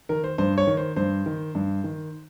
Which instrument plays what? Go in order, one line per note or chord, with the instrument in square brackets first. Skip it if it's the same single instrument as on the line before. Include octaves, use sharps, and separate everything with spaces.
[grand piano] D#3 A#4
C5
G2 C5
C#5
D#3
C5
G2 C5
D#3
G2
D#3